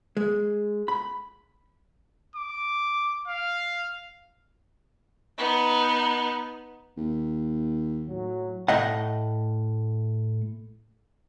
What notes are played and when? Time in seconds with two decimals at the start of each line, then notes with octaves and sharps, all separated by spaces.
0.17 G#3
0.88 B5
2.35 D6
3.27 F5
5.38 B3 D#4
6.97 D#2
8.09 A2 F#3
8.69 A2 A3 D#5 F#5